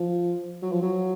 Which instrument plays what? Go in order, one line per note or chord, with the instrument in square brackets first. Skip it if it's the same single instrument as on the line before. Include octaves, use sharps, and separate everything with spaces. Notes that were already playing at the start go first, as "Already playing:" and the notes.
Already playing: [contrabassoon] F3
F#3
F3
F#3